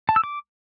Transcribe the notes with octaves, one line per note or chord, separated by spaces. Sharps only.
A5
E6
D6